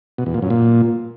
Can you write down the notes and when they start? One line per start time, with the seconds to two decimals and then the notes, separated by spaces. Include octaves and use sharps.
0.18 B2
0.26 E2
0.34 A#2
0.42 F#2
0.50 A#2